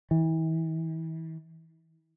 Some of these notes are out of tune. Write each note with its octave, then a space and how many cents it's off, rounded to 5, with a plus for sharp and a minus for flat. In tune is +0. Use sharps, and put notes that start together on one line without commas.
E3 -35